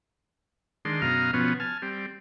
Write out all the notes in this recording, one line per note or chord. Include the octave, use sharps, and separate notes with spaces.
D#3 G#3 D4 C6
F#2 B2 D#5 F5 A#5 F6
B2 F3 B3 C#4
G#5 A5 F6
G3 C4